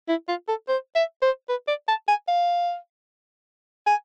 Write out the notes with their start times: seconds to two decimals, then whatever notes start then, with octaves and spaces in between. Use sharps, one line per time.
0.09 E4
0.28 F4
0.48 A4
0.69 C5
0.95 E5
1.22 C5
1.49 B4
1.68 D5
1.88 A5
2.08 G#5
2.28 F5
3.87 G#5